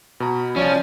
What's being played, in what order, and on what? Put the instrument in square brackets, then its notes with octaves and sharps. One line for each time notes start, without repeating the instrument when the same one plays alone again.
[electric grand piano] B2 A#5 [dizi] B5
[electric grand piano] C2 [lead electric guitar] F3 [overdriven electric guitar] C#4 [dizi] D5